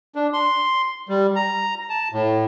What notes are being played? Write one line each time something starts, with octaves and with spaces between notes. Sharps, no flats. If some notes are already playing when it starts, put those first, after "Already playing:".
D4
C6
G3
A#5
A5
A2